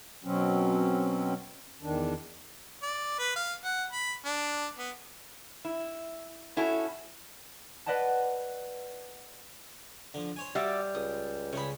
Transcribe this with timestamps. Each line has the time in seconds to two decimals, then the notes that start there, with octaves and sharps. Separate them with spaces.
0.24 B2 F#3 C4 C#4
1.83 E2 D#3 D4
2.83 D5
3.19 B4
3.36 F5
3.64 F#5
3.93 B5
4.26 D4
4.78 B3
5.65 E4
6.57 C#4 E4 F#4 A4
7.86 B4 D5 D#5 F#5 A5
10.14 D3 F3
10.36 C5 C#5 G#5
10.55 G3 F#4 D5 E5
10.95 C#2 D#6
11.53 C#3 G#3 G#4 C#5 B5